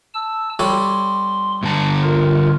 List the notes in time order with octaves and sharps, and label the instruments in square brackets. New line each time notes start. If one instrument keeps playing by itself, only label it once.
[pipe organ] A5 E6
[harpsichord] G3 A4 C#5 [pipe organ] C6
[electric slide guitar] G2 D3 A5
[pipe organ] F4 A#4